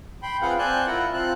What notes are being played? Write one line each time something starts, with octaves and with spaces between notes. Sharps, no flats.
G5 B5 C6
C4 F4 G#4 B4 F5 F#5
C4 D5 G#5 A5 F#6 G6
E4 F4 A#4 F#5
C4 F4 A5 F#6